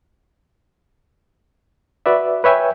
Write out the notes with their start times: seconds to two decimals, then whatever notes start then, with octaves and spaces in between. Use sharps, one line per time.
2.06 F#4 B4 D5 E5
2.44 B4 C#5 E5 G5 G#5